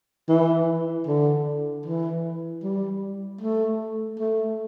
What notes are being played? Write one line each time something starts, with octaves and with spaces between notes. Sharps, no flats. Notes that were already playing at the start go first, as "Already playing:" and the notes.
E3
D3
E3
G3
A3
A3